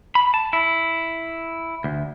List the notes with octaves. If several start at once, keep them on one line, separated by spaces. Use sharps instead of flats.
B5
A5
E4
D2